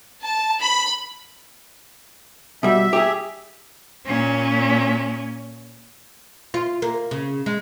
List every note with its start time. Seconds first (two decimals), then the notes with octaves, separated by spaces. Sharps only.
0.22 A5
0.62 B5
2.63 B2 G3 E5
2.93 G4 G#4
4.06 A#2 C#4
6.54 F4
6.82 A#3
7.11 C#3
7.46 G#3